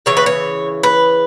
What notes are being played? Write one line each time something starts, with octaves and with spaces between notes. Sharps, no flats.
C#3 E3 C#5
B4
C#5
B4